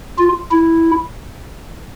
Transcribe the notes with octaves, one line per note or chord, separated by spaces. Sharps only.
F4
E4